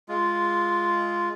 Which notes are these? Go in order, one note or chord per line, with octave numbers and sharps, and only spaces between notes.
G#3 F4